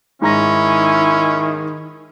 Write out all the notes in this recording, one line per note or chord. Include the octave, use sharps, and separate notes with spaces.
G#2 D#3 C#4 E4 A#5 A#6